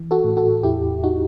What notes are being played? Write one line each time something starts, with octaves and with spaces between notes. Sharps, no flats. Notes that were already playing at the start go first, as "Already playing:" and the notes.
Already playing: E3
F#4 A4
A2
F#4 A4
E2 E4 G4
D#4 F#4